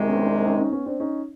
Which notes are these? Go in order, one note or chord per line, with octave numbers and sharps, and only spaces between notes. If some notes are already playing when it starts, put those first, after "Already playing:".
Already playing: C2 C3 D#3 G#3
B3 C#4
C4 D4
C#4 D#4
C#4 D#4
B3 C#4
C4 D4
C#4 D#4